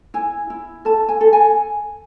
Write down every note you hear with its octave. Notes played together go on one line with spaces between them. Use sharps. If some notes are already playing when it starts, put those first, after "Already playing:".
E4 G#5
E4
A4 A5
G#5
A4
G#5